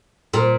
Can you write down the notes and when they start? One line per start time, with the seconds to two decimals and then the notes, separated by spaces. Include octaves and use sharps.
0.34 A#2